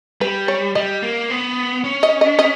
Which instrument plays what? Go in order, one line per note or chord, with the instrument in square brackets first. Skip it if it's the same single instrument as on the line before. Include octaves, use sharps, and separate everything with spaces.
[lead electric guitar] G3 [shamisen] B4
[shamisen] C#5
[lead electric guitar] G3 [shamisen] D#5
[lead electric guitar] A#3
B3
C#4
[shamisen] D#5
D#5
D#5